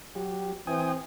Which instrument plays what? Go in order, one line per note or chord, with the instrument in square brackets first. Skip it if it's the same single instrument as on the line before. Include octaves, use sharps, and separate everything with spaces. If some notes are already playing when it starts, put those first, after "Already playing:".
[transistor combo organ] F#3 [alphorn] G4
[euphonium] E3 [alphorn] C4 [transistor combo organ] G5 G#5 D#6